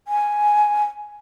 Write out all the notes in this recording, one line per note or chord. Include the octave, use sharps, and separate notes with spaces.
G#5